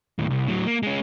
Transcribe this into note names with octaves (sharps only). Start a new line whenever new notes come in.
D#2 A2
C2
A2 F#3
A#3
G#3 C#4